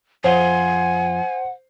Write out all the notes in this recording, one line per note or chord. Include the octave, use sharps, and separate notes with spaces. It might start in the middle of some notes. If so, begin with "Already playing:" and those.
F2 F4 C5 F#5 G#5